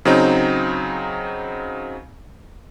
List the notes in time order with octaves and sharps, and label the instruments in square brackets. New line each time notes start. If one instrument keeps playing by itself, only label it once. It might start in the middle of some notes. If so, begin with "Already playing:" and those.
[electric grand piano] C#3 F#3 C4 D#4